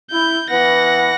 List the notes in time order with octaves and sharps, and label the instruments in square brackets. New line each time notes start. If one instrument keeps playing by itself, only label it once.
[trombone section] E4 [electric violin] G6
[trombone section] E3 B3 B4 [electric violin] F#5 A#6